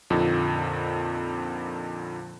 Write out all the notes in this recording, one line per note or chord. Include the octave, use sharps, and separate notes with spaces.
F2 A#2 D3 D#4